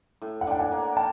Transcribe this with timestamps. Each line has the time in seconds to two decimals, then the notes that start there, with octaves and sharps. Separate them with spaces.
0.22 A2
0.41 F#5
0.47 D4 G5
0.59 F#5 G#5
0.72 A#3
0.97 G5 A5